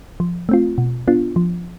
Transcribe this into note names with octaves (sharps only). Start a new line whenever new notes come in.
F3
A3 C4 F4
B2
B3 D4 F4
F3